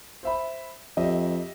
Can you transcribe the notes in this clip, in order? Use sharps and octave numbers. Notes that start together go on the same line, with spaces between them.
C5 E5 B5
F2 G4 D#5 E5